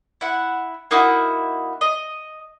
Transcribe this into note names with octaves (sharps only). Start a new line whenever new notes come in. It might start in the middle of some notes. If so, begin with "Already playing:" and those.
E4 F#5
A#3 D#4 E4 F#4
D#5